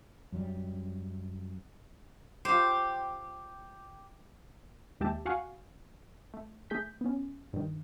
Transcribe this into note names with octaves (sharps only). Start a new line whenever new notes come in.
F#2 F#3 G3
F4 G4 C5
D#2 G#3 G4 E5 A5
F#4 F5 F#5 G#5 C#6
A3
A3 G#4 G6 B6
B3 C#4
G2 D#3